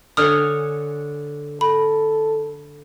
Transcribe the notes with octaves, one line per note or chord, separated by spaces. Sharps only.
D3 C#5 G#5 D#6 F6
A4 B5